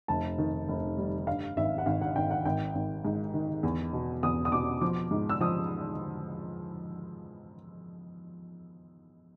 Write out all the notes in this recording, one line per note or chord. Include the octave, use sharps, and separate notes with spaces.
F1 A5
D#3
F1
G3
G2 F5
G#1 E5
F#5
G#1 F5
F#5
G#1 G5
F#5
G#1 G5
G#1
G#2
D#3
E2
B2
E2 D#6
D#6
B2 D6
F3 D6
G#2
E6
F3 D#6